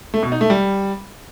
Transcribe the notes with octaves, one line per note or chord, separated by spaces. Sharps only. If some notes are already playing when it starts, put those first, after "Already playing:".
A3
B2
D#4
A3
G3